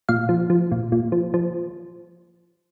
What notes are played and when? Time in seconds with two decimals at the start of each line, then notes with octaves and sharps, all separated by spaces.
0.09 A#2 F5
0.29 F3
0.50 F3
0.72 A#2
0.92 A#2
1.12 F3
1.34 F3